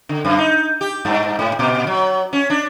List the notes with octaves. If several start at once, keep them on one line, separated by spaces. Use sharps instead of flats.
D3
F#2
D#4
G4
G2
G#2
A#2
F#3
C#4
D4